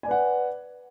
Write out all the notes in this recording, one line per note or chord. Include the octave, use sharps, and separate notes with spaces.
B4 D5 F#5 G#5